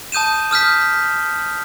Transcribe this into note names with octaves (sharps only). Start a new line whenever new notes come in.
A5 D#6 G6 D#7 E7
D#6 F6 G6 B6